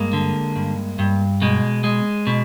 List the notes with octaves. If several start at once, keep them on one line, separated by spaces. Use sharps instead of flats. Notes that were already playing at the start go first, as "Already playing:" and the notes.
Already playing: G2 G#3 A#3
D3
G2
G2
B2 G#3
G#3
B2